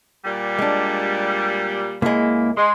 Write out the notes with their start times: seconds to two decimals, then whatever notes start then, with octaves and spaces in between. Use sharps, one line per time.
0.25 A#2 G3
0.59 G#3 D4
2.02 C#2 G#3 A#3 E4
2.57 G#3 C6